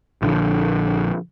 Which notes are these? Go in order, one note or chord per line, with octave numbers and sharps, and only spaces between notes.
A#1 D3 F3